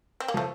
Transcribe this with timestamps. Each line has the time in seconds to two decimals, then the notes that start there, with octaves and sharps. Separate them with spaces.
0.20 C4
0.28 A#3
0.34 F3 A3